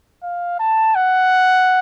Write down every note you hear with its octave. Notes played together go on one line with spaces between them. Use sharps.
F5
A5
F#5